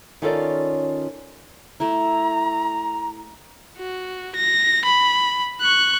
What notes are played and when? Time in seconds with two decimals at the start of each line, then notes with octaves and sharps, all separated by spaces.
0.22 D#3 C#4 F4 A4 C#5 D5
1.80 A3 E4 A#5
3.78 F#4
4.36 A#6
4.85 B5
5.61 C#6 F#6